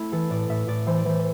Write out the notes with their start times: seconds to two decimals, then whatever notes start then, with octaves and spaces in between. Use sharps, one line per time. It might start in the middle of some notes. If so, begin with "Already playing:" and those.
Already playing: A3 C4 E4
0.12 E3 A4
0.30 A2 D5
0.49 A2 E5
0.68 A2 D5
0.87 E3 C5
0.98 D5
1.06 E3 C5